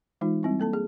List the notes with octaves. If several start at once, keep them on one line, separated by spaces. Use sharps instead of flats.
E3 G#3 D#4 F4
G3 C4 E4
A#3 A4 A5
G#4